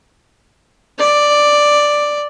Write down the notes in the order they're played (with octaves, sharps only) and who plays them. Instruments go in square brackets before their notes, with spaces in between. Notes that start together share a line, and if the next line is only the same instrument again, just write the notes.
[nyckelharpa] D5